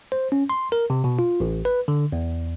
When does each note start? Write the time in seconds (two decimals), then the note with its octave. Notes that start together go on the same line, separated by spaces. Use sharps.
0.12 C5
0.32 C#4
0.50 C6
0.72 A#4
0.90 C3
1.04 B2
1.19 F4
1.40 A1
1.65 B4
1.88 D3
2.12 E2